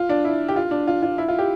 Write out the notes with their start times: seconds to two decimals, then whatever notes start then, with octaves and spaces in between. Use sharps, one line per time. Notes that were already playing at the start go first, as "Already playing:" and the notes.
Already playing: F4
0.09 D4
0.25 E4
0.48 G4
0.56 F4
0.71 D4
0.87 F4
1.02 F4
1.18 E4
1.28 F4
1.38 G4